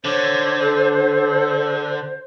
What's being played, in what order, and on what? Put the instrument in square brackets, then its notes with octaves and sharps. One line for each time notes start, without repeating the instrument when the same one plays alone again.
[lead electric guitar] D3 [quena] C5 [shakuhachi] C#5
[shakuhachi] A4